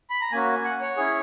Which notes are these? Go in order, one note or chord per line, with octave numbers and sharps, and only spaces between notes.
B5
A#5
A#3 C#4 F#4 G#5
F#5
C#5
C#4 E4 G#4